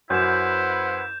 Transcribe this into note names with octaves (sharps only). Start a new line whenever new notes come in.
F#2 E4 B4 C5 F#5 G6 E7